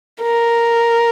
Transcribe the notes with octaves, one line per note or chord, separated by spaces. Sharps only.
A#4